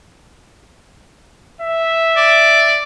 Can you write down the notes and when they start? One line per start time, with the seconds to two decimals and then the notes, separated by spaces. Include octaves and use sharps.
1.61 E5
2.17 D5